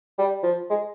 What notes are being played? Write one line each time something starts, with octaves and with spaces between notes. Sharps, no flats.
G3
F3
G#3